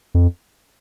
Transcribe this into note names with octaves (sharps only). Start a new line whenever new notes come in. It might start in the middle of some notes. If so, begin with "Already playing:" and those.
F2